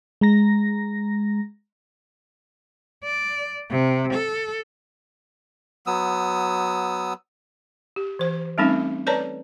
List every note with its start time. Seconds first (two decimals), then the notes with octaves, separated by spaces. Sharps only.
0.21 G#3 A#5 A#6
3.04 D5
3.71 C3
4.13 A4
5.87 F#3 B3 D#6 E6
7.96 G4
8.19 E3 C5
8.58 G3 A3 C4 C#4 D#4 A4
9.07 A4 B4 C#5 D5 A5 A#5